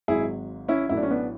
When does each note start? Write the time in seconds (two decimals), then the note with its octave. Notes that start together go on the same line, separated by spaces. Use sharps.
0.08 G#1 G#2 F#3 E4 G#4
0.68 C#4 E4
0.89 A1 A2 F#3 E4
0.97 D4
1.03 C#4
1.10 B3 D4